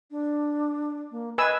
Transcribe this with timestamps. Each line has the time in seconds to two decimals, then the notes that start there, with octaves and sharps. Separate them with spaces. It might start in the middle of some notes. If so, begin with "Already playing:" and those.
0.11 D4
1.11 A#3
1.38 B4 D#5 G#5 E6